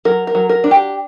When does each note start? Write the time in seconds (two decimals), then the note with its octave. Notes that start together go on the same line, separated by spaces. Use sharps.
0.05 F#3 A#4
0.27 A#4
0.35 F#3
0.49 A#4
0.64 D4
0.71 G4